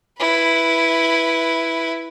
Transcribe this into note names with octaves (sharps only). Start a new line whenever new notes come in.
E4 B4